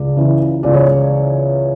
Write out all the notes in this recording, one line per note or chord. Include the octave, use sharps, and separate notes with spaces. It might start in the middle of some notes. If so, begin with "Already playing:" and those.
Already playing: C#2 D5
C#3 E3
C#2 D5
C#5